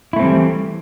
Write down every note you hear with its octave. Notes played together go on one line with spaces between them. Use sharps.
E3 G3 A3 C4 E4